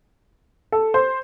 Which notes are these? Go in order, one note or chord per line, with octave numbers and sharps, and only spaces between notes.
A4
C5